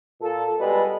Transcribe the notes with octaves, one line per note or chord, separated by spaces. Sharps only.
A#2 A4
B2 G3 G#3 A4 B4